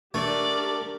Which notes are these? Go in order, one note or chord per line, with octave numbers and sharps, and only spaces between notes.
A3 D4 G4 A#4 D5